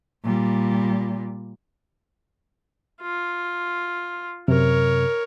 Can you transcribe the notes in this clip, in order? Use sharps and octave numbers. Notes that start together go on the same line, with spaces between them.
A#2 G3
F4
F#2 C3 A#4 C#5